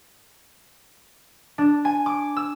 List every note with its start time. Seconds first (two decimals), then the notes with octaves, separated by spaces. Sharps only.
1.58 D4
1.85 G#5
2.06 D6
2.37 E6